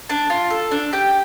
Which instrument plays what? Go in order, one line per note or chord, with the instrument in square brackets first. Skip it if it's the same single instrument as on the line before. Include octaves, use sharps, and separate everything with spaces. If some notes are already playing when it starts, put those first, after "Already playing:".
[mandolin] D4 A5
F4
A4
D4
G4 G5